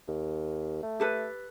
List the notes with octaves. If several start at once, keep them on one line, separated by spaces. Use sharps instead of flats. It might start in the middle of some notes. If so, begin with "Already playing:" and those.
D#2
A3
G4 A4 B4